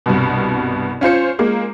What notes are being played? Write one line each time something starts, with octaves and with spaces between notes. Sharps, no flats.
C2 G2 B2
C#4 F4 C5 C#7
G#3 A#3